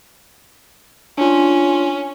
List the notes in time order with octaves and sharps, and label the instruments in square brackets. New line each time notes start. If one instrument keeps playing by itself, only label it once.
[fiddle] C#4 [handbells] D4 F4